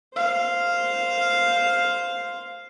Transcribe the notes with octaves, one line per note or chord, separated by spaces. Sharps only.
C5 F5